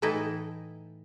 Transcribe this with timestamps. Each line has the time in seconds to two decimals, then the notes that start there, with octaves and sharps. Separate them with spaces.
0.02 A2 E3 D#4 E4 A4